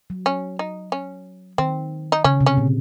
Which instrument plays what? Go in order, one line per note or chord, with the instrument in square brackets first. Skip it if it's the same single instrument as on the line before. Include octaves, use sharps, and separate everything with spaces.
[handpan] F#3
[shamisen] C#4
D#4
C#4
[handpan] D#3 [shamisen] C4
[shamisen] D#4
[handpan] C#3 [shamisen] C#4
[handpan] C3
[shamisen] C#4
[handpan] A#2